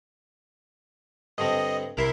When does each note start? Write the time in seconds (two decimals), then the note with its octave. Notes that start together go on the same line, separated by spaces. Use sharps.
1.38 G2 D3 C4 D#5
1.97 C2 E4 A#4 E5 C6